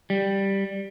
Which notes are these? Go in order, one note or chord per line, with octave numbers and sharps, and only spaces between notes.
G3